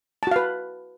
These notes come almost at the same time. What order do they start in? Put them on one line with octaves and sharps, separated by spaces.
A5 F#4 F5 B4